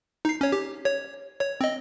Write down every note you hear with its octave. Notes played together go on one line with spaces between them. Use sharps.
D#4 C7
C#4 C#5
G4
C#5
C#5
C4 D#5